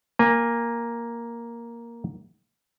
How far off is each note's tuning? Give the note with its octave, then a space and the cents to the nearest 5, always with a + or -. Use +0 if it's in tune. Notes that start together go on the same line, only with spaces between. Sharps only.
A#3 +5 G#5 -20